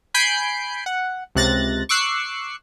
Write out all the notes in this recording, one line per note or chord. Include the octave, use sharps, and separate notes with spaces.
G#5 B5 G6 C7 D7
F#5
C#2 C3 F#6 A6 A#6
C#6 D6 E6 F#6 C7